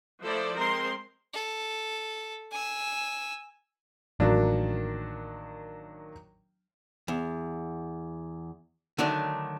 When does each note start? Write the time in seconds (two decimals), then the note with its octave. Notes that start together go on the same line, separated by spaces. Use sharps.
0.23 F3 A3 E4 A4 C5 D5
0.55 G#3 C4 A#4 C5 C6
1.33 A4
2.52 G#5 E6
4.20 A1 D#3 F#3 A#3 D4
7.08 E2
8.98 D3 D#3 F#3 A3 D4